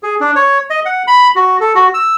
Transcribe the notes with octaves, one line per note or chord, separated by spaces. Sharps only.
G#4
D4
C#5
D#5
F#5
B5
F#4
A4
F#4
E6